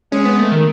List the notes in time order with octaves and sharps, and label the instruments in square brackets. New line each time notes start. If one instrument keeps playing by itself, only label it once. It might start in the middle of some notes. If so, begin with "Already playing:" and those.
[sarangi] G#3 [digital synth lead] C#4
[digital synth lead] B3
A3
D#3